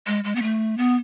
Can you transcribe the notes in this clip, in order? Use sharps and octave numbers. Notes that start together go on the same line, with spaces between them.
G#3
G#3
B3
A3
B3